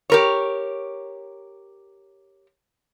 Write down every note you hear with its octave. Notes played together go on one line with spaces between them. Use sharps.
G4 A#4 C#5